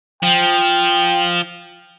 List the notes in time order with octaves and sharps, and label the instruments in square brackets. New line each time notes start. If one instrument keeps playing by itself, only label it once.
[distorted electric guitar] F3 [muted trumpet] G5